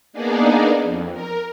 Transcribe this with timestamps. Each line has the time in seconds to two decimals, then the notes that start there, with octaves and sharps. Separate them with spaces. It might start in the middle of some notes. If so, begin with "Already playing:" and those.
0.13 A#3 B3 D4 D#4 G#4 D5
0.82 F2
1.12 A#4